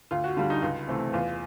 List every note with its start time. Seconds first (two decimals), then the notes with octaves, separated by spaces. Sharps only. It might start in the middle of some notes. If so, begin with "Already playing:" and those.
0.11 D2 F4
0.24 F#4
0.37 D3 G3 F4
0.50 D#4
0.62 C#2 F4
0.88 C3 E3 A3 C4
1.13 E2 F4